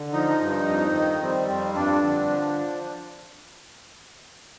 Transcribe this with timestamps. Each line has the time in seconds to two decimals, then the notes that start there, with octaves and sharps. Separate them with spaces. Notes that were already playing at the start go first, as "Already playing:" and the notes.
Already playing: D3
0.13 F3 D#4
0.40 G2
0.68 F2
0.94 D#3
1.22 G3 C4
1.48 F2 C4
1.75 G2 D4
2.03 D3
2.29 F3